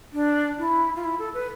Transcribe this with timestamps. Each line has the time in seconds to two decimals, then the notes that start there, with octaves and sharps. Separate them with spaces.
0.13 D4
0.59 E4
0.96 F4
1.04 E4
1.19 A4
1.34 B4